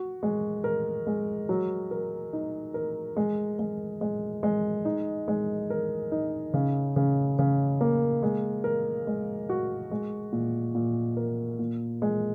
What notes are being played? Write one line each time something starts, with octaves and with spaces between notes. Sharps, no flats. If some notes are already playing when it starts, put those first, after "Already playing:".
Already playing: F#4
G#3
A#4
G#3
F#3
A#4
D#4
A#4
G#3
G#3
G#3
G#3
D#4
G#3
A#4
D#4
C#3
C#3
C#3
A#3
G#3
A#4
G#3
F#4
G#3
A#2
A#2
A#4
A#2
G#3